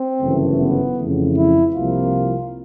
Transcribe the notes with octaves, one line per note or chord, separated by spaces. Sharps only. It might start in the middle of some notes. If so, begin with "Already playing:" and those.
Already playing: C4
G1 F#2 C#3 E3 A3
B3
F2 C#3 E3 A3
E4
C2 C3 F3 A#3 F4